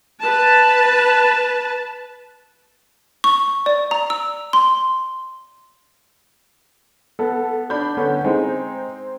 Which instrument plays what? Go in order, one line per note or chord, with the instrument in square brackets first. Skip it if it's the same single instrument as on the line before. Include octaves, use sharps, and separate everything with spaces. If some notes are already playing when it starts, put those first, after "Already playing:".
[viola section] B4 A5
[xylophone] C#6
D5
A#5
E6
C6
[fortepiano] B3 [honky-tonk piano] A4
[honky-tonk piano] D4 B5 G6
[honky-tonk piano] D3 [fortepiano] B3 C#4
[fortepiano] G#3 D#4 [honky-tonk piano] C4